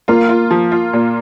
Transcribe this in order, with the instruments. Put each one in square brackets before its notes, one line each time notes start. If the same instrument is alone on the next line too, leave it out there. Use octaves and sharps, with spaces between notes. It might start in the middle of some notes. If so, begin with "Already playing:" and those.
[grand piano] A#3 [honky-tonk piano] F4
[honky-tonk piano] F4
F3
F4
A#2